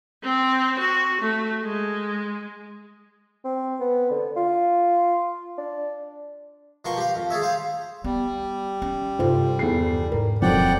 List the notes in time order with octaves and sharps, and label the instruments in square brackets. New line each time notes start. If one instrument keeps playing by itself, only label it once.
[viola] C4
F#4
A3
G#3
[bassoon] C4
B3
D3
F4
D4
[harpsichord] B2 F3 A#4 C6 C#6
G4 F5
F2
G#4 A4 C#5 E5
C5 F5
[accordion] G3 [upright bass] B3
[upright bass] C#4
[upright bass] G2 C3 [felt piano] F4 A4 C5
[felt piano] E2 A4 C7
[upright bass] G#2 [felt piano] A#4
[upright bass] D#1 [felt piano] F2 F#3 A4 [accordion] D5 F#5 G5